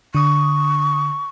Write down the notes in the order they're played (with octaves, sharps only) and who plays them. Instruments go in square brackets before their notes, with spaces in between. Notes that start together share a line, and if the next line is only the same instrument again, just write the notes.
[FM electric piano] D3 D#6 [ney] C#6